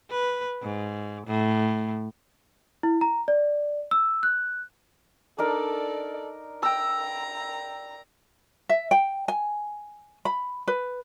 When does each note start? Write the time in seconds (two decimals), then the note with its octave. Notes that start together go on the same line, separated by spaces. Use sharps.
0.10 B4
0.62 G#2
1.27 A2
2.83 E4
3.01 A#5
3.28 D5
3.91 E6
4.23 F#6
5.38 D4 D#4 A4 A#4 D5
6.63 G5 A#5 E6
8.69 E5
8.91 G5
9.28 G#5
10.25 B5
10.68 B4